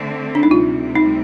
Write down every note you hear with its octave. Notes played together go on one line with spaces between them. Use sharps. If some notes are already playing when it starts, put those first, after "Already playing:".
Already playing: D3 A3 C4
D4
D#4
D2 C3 G3 C4 F4
D#4